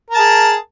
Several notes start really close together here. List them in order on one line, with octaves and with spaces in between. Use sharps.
A#4 A5 G#4